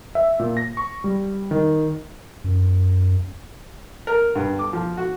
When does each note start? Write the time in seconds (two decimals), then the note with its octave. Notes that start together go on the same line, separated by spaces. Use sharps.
0.15 E5
0.40 A#2
0.57 A#6
0.77 C#6
1.04 G3
1.51 D#3
2.44 F#2
4.07 A#4
4.35 G2
4.59 D6
4.73 F3
4.97 F#4